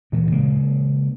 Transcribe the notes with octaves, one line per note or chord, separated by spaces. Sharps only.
D2 A#2 E3 A#3
C#3 G#3 A#3